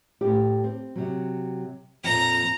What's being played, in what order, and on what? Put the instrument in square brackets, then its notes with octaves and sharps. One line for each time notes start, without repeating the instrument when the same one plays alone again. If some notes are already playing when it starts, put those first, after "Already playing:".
[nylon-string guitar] A2 G4
C4
C3 F#3
[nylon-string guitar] F2 A#2 [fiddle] A#5